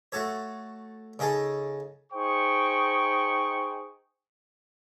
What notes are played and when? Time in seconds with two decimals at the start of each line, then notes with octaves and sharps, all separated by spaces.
0.12 A3 F#4 A4 C#5
1.19 C#3 D#4 G#4 A4
2.13 D#4 G#4 C5 G5 C#6